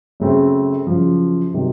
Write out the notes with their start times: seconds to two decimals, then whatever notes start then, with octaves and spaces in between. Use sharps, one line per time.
0.20 F#2 C#3 A3 C4
0.87 F#2 C#3 F3
1.54 C3 D#3 F#3 C4